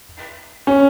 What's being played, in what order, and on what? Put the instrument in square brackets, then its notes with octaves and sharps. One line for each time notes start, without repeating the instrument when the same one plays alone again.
[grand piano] C#4